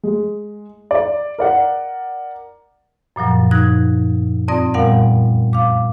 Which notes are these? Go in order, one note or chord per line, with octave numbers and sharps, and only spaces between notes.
G#3
D5
A#4 D5 F#5
F#2 A#2 F3 F#3
D#4 F#6 G#6 A#6
F2 C4 D5 D#6 A#6
A#2 G3 B3 A#4 F5 F#5
F5 D6